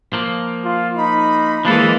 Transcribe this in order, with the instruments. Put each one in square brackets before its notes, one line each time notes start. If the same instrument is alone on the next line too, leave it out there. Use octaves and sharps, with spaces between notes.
[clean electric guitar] F3 A#3
[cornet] F4
[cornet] D#4 [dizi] B5
[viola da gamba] E3 G#3 A#3 [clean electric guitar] F3 D4 A4